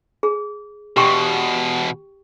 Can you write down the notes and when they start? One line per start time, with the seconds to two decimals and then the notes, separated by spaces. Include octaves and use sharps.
0.23 G#4
0.97 E2 B2 G4 G5 C#6